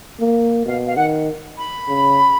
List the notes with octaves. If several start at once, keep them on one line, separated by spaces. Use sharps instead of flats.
A#3
B2 F5
F5
D#3 F#5
B5
C#3